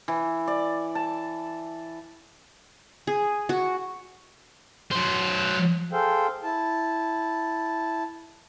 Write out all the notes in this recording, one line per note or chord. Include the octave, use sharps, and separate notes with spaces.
E3
D5
A5
G#4
F#4
F#3 C5
G#4 A4 C5 F5 G5
E4 A5